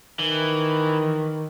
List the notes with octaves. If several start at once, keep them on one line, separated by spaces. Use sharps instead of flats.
D#3 E3